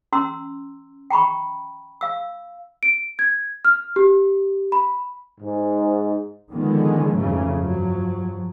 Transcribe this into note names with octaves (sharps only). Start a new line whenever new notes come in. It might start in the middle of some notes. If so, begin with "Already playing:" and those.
C#4 A#5 C6 E6
G5 A#5 B5 C#6
F5 E6
D7
G#6
F6
G4
B5
G#2
D3 D#3 F3 G#3 B3
F2 G#2 C#3 E3 F#3 A3
G2 F3 F#3